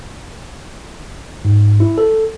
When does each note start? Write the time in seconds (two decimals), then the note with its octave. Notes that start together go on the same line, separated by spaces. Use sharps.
1.45 G#2
1.80 E4
1.98 A4